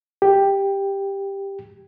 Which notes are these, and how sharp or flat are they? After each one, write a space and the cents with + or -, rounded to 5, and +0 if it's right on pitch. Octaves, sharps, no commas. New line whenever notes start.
G4 +10